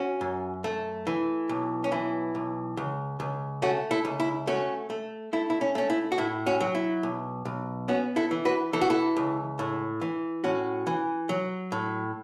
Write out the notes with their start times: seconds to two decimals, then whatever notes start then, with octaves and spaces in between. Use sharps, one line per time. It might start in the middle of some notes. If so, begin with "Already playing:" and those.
Already playing: C#4 F#4
0.21 F#2
0.64 A3
1.07 E3
1.49 B1
1.84 C#4
1.92 E3 E4
2.35 B1
2.77 C#2
3.20 C#2
3.62 A3 C#4 F#4
3.91 E4 A4
4.05 C#2
4.20 E4
4.47 A3 C#4 F#4
4.90 A3
5.33 A3 E4
5.50 E4
5.61 C#4
5.75 A3 C#4
5.90 E4
6.12 F#4
6.18 A2 E4
6.46 C#4 F#4
6.60 F#3
6.75 E4
7.03 B1
7.45 B1
7.88 B3 C#4 F#4
8.16 E4 A4
8.31 E3
8.45 F#4 B4
8.73 E3 A4
8.81 F#4
8.90 E4 A4
9.16 C#2
9.59 A2
10.01 E3
10.44 A2 C#4 F#4
10.87 E3
11.29 F#3
11.72 A2